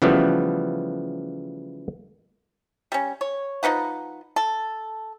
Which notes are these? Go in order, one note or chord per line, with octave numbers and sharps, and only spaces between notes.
C#3 E3 F3 G3 A3 B3
G3 C#4
C#5
F3 D#4 B4 F#5
A4